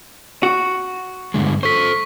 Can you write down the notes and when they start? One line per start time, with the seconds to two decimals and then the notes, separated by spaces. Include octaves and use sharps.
0.43 F#4
1.34 G2 D3 G#3
1.63 A4 C5 C#6 B6